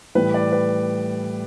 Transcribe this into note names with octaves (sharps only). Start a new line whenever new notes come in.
A2 E3 G3 B4
D5
B4